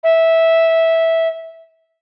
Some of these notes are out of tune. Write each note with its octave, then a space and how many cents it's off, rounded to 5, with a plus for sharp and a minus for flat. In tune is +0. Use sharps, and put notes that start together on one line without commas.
E5 -10